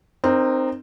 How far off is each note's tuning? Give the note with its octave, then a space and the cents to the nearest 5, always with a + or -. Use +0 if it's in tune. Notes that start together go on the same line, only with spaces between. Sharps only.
C4 +0 D#4 -30 A#4 +0